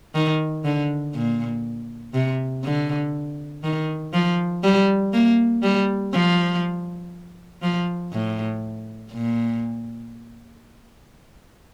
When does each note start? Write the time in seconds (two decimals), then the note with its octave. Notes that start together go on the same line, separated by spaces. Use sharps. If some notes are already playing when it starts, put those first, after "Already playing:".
0.15 D#3
0.65 D3
1.14 A#2
2.14 C3
2.64 D3
3.64 D#3
4.14 F3
4.63 G3
5.13 A#3
5.63 G3
6.13 F3
7.62 F3
8.13 A2
9.12 A#2